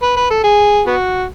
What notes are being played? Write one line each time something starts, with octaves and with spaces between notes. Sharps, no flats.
B4
B4
A4
G#4
B3 F#4